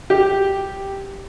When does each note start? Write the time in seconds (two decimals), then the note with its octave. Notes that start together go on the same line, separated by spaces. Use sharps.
0.10 G4